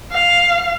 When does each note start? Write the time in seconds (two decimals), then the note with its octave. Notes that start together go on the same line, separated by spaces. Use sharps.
0.12 F5